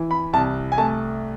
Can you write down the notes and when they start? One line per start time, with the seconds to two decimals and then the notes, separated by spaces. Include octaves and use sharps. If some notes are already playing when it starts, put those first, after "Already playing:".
Already playing: E3
0.11 B5
0.33 C2 A5
0.72 G#5
0.78 A3 A5